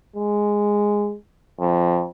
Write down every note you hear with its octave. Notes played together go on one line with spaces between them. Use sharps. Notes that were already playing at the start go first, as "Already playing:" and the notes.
G#3
F2